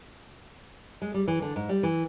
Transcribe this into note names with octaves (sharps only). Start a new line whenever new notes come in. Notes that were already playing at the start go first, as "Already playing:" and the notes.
G#3
G3
E3
D3
G#2
G3
E3